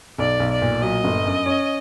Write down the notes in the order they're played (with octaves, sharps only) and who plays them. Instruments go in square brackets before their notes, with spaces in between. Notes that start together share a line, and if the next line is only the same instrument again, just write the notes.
[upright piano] B1 [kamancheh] D5
[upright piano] B1
[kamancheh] D5
[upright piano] A#2
[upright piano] F#3 [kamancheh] D#5
[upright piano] G1
F#2
C#4